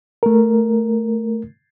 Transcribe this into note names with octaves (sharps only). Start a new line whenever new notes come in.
A3 A#4